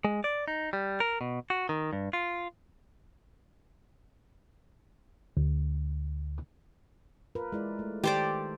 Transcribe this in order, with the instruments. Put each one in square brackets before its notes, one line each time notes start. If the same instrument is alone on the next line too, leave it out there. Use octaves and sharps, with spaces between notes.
[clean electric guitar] G#3
D5
D#4
G3
A#4
B2
F#4
D#3
G2
F4
[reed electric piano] D2
[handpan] F4 A#4 B4
G#3 E4 D5
A3
[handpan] D#3 A4 [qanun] G4 C5 D5